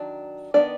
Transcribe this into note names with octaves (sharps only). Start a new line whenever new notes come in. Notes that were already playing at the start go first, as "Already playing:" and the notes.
Already playing: D#3 F#3 D4
D#3 F#3 B3 D4 D5